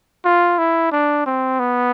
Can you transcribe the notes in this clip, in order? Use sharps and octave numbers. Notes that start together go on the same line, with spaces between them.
F4
E4
D4
C4
B3